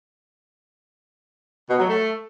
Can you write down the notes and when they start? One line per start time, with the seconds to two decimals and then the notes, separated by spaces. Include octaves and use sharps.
1.69 B2
1.79 F#3
1.89 A3